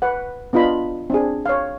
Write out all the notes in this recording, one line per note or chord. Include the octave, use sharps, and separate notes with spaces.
B4 F#5
B3 D4 F4 D#5 B5
C4 D4 G#4
C#5 F5